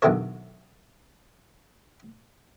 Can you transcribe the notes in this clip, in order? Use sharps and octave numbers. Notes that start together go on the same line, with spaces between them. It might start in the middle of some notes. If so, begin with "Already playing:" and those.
B1 E2 D3 D#3 A4 C#5